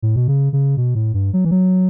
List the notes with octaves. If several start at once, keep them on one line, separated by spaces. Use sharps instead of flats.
A2
B2
C#3
C#3
B2
A2
G2
F#3
E3
F#3